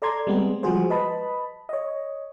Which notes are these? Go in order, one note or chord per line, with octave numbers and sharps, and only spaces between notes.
A4 D5 A5 A#5 C6 G#6
G3 G#3 B3 C4 G#4
F3 G3 G#3 F#4 G#4 C5
B4 D#5 A5 B5
C#5 D#5